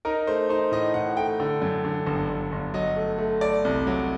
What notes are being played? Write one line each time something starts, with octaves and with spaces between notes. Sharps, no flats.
D#4 A#4
A3 C5
D#4 C5
A2 D#5
A2 F#5
A3 G5
D3
F#2
D3
G1
G1
G1
F#3 D#5
A3
A3
A3 D5
C2
F#3